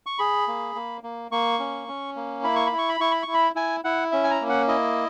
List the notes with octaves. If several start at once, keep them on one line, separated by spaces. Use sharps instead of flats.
C#6
G#4 B5
A#3
A#3
A#3
A#3 C#6
C#4
C#4
A#3
E4 B5
C#6
B5
E4
C#6
B5
E4 C#6
B5
C#6
E4
B5
E4 G#5
E4 F#5
C#4 E5
G#5
A#5
A#3
F#5
E4 D#5